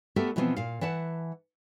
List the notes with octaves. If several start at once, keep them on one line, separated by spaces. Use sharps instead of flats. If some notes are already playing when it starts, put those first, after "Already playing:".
A3 B3 G4 A4 A#4 E5
B2 E3 F3 G3 B3 C4
A#2 F5
E3 E5 F#5 A5